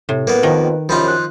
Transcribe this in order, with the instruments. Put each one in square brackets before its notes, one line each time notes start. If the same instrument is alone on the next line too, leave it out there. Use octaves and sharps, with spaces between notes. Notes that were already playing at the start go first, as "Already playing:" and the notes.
[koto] A2 [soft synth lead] C3
[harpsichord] A#3 B3 [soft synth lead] B4
[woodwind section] F2 F3 [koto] D#3
[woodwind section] F#2 C3 [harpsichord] F3 D#4 F4 [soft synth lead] B5
[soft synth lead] F#6